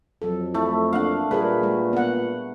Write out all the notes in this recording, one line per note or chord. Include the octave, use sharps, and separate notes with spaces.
F2 F#3 A4
A3 E4
A#3 D4 F5 F#5
A#2 G3 G#4 A#4 B4
G#3
B3 F#5